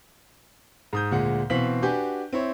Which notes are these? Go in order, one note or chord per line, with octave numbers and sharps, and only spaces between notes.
G#2 D#6 G6
D2 A#2 G#3 F#5
B2 E3 C4 F5 B6 F#7
D4 F#4 G4 B4 G#5 G6
C4 E4 C#5